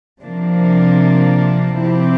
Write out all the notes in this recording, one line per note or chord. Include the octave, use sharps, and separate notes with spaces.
C3 F3 A#3 D4
C3 F3 C4 E4 G4